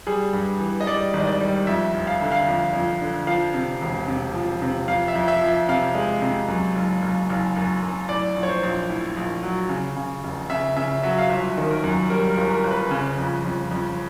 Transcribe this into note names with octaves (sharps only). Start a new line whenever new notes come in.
G3 G#4
G2
E3
D#5
G3 D5
G#1
D#5
D5
G3
F2 E5
F1
F5
D3 E5
F5
F2
F2
D3
F3 F5
C3
E1
C3
F3
C3
F2 F5
E5
F2
E5
F3
E5
C3 F5
G#3
C3
F#2
F#1
F#1
F#1
F#2
F#2
A2 D5
A#1
C#5
C5
A#1
A2
A#1
F#3
C#3
C#3
F1
C#3 E5
C#3 E5
F#3 E5
F5
G1 E5
D#3
A#4
F#2
G3 A#4
A#4
G1
A#4
G1
B4
C#3
F2
F2
F2